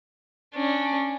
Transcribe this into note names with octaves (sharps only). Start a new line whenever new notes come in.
C#4 D4